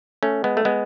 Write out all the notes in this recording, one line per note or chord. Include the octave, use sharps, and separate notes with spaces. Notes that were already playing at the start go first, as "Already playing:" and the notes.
A3 C#4
G#3 B3
A3
G#3 B3